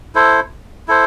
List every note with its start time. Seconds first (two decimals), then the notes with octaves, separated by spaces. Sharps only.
0.15 E4 A4 C5
0.88 E4 A4 C5